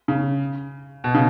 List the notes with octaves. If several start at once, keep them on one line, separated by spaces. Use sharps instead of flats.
C#3
B2
C#3